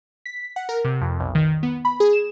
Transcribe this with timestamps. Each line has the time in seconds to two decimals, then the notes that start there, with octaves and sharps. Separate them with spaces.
0.26 B6
0.56 F#5
0.69 A#4
0.85 C3
1.01 F2
1.19 B1
1.35 D#3
1.63 B3
1.85 B5
2.00 G#4
2.13 E7